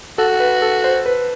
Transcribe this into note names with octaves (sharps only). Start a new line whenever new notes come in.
F#4 A4
B4
A4
C5
B4